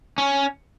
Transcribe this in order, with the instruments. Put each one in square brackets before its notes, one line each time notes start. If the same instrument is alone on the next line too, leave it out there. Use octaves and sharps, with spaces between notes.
[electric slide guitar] C#4